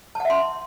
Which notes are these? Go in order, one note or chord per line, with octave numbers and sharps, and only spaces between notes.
E5 F#5 A5 C6